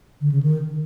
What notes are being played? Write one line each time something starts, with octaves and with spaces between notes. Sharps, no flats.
D3
C#3
D#3